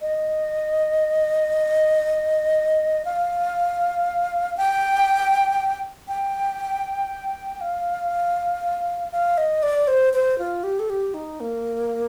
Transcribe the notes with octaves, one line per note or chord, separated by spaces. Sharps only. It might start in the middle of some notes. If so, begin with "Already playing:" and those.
D#5
F5
G5
G5
F5
F5
D#5
D5
C5
C5
F4
G4
A4
G4
D#4
A#3